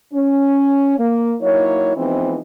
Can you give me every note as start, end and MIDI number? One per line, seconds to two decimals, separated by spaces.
0.14 0.97 61
0.98 1.34 58
1.41 1.93 54
1.41 1.93 58
1.41 1.93 63
1.41 1.93 64
1.41 1.93 73
1.96 2.38 52
1.96 2.38 53
1.96 2.38 56
1.96 2.38 59
1.96 2.38 60
1.96 2.38 63